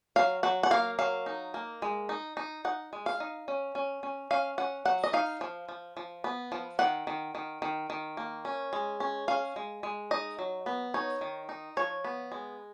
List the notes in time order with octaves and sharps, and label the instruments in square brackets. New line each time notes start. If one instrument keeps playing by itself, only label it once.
[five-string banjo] F#3 F5
F#3 F#5
F#5
A#3 F5
F#3 F5
D#4
A#3
G#3
D#4
D#4
D#4 F#5
G#3
F5
D#4
C#4
C#4
C#4
C#4 F5
C#4 F#5
F#3 F#5
D#5
D#4 F5
F3
F3
F3
B3
F3
D#3 F#5
D#3
D#3
D#3
D#3
A#3
C#4
G#3
C#4
C#4 F5
G#3
G#3
D#4 D#5
F#3
B3
D#4 C#5
D#3
D#4
F3 C#5
B3
G#3